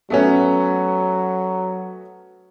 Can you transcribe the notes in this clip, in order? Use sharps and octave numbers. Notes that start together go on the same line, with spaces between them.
F#3 A3 B3 C#4